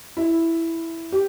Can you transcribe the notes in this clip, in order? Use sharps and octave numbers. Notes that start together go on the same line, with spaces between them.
E4
G4